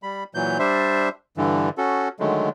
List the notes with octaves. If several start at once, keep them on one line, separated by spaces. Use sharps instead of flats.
G3 B5
A#2 E3 F#3 G6
G3 D4 C5 E5
G2 D3 E3
C#4 F#4 A4
D3 D#3 F#3 G#3 A3